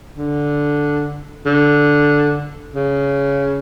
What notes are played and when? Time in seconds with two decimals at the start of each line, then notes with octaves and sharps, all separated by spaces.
0.18 D3
1.46 D3
2.74 C#3